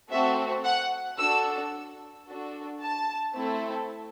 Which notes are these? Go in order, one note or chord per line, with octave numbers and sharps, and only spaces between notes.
A3 C4 F#4 A4 E5
F#5
D4 F#4 A4 E6
D4 F#4 A4
A5
A3 C4 E4 A4